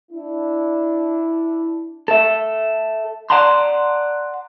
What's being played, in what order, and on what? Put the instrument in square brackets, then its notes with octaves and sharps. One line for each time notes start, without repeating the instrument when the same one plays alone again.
[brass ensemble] D4 E4
[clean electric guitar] A4 E5
D5 F#5 A5 A#5 C6